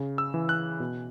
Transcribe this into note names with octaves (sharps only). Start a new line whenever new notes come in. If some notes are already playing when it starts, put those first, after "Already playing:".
Already playing: C#3
E6
E3
F#6
B2